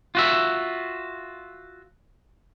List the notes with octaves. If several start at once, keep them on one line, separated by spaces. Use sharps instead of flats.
F4 F#4 E5